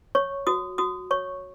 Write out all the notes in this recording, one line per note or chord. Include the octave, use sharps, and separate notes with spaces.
C#5 C#6
F#4 D#6
F#4 D#6
C#5 C#6